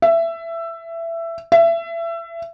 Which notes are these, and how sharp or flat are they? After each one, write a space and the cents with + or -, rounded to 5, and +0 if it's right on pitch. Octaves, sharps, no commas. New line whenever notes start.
E5 +15
E5 +25